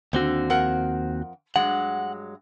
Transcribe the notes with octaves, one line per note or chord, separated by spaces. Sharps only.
D#2 D3 C4 F#4
F2 A#4 F#5
G2 F#3 G#3 F#5